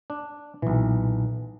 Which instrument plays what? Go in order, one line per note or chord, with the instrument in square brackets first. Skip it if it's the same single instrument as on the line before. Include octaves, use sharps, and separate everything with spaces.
[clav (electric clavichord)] D4
[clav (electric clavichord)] B1 E3 [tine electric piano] A#2